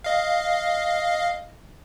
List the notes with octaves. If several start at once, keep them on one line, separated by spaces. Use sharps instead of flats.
D#5 F5